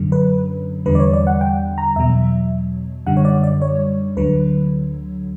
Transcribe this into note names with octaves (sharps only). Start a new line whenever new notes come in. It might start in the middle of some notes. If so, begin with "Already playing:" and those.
Already playing: F#2 D3 F#3
B4
E2 D3 G3 B4
D5
C#5
D5
F#5
G5
A#5
E2 B2 F#3 E5
F#2 D3 G3 F#5
C#5
D5
D5
C#5
D2 D3 F#3 B4